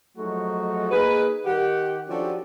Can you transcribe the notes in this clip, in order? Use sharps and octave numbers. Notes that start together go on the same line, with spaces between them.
F3 F#3 G#3 A3 D#4 F#4
A#3 D#4 G#4 B4
D#3 G4 F#5
F3 C#4 D4 F#4 G4 A4